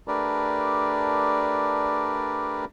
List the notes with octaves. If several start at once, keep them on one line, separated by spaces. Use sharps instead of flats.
A3 D4 G4 A#4 B4 D5